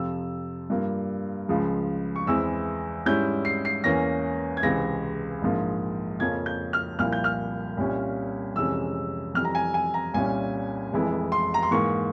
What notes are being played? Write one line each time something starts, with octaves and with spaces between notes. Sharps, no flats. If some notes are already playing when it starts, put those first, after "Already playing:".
Already playing: F2 C3 F3 E6
G2 G3 A#3 F4
C#2 C#3 F3 G#3
C#6
E2 E3 G#3 C4 E4 E6
G#2 G3 C#4 E4 G6
C7
C7
E2 E3 A#3 C#4 A#6
G#6
C#2 C3 E3 G#3 C4 A#6
A#1 G#2 F3 A#3
F2 C#3 F3 A#3 C#4 G#6
G6
F6
C2 A#2 F3 A#3 E4 F6
G6
F6
C2 A#2 G3 C#4 F4
F2 C3 E3 G#3 C#4 E6
F2 E3 G3 F6
A#5
G#5
G#5
A#5
C2 A#2 G3 C#4 G#5
F1 F2 E3 G#3 E4
C6
A#5
C6
G#2 E3 A#3 C#6